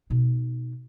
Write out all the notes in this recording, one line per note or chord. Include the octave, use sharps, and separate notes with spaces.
B2 D#4